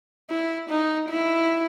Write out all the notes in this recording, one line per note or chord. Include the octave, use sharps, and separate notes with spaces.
E4
D#4
E4